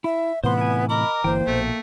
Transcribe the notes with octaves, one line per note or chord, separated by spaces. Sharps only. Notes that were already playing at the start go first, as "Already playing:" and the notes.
E4 E5
A2 C3 E3 B3 C5 C6
E4 G#5
A#4 D#5 B5 D6
G1 E3 A#3 C5 G5
A#1 B2 A3